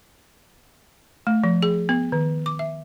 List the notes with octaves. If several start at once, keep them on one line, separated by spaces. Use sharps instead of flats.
A3
F3
G#4
B3
D#3
D6
E5